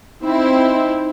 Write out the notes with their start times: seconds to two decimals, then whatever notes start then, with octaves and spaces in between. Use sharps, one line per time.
0.23 C4 D#4 E4